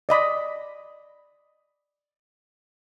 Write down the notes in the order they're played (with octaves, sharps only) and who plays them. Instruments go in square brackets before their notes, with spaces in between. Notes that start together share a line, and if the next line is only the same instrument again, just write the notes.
[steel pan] D5 D#5 B5 C6